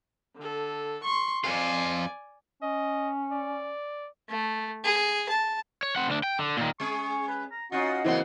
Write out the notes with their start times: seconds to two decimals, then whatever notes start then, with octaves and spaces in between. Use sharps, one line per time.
0.37 D3 A4
1.04 C6 C#6
1.44 F2 F4 D5 G#5
2.62 C#4 D#5
3.32 D5
4.29 A3
4.84 G#4
5.29 A5
5.83 C#5
5.96 C4 F#5
6.09 D2 D4
6.23 G5
6.38 D3
6.57 A#2 D#3
6.80 G#3 C#4 G#4 C#6
7.28 B4
7.51 A#5
7.72 C#4 D#4 F4 F#4 D#5 F#5
8.04 C#3 E3 F#3 A#3 C4 C5 F#5